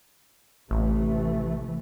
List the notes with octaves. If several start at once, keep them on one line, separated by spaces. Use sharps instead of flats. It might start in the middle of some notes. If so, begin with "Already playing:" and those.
A1 C3 E3 A3